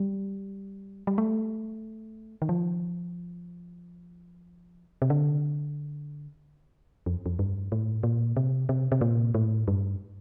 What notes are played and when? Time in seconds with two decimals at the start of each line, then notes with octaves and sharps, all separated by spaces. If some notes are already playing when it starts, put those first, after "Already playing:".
Already playing: G3
1.07 G3
1.18 A3
2.42 D#3
2.49 F3
5.02 C3
5.10 D3
7.06 F2
7.26 F2
7.39 G2
7.72 A2
8.03 A#2
8.37 C3
8.69 C3
8.92 C3
9.01 A#2
9.34 A2
9.68 G2